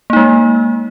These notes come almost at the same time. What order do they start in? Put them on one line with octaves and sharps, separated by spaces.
A#3 D#4 G#3